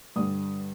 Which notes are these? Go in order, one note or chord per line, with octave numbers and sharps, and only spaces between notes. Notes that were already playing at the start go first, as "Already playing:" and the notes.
G2 D3 G3 D#6